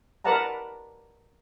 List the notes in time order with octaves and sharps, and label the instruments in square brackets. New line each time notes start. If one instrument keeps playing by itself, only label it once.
[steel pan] A#4 B4 D5 F#5 A5 A#5